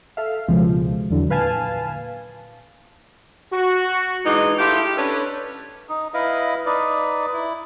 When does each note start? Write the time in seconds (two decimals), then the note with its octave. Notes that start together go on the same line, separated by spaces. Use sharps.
0.17 A4 E5 F5
0.48 C#2 B2 F3 G#3
1.10 E2 D3 E3 F#3
1.30 A#2 B4 F5 G#5 A5
3.53 F#4
4.25 E3 G#3 D4 D#4
4.58 A3 E4 F4 G4
4.98 C#4 D4 A4 B4
5.89 D#4
6.14 E4 B4 D#5 F5
6.66 D#4 B4 D5
7.33 E4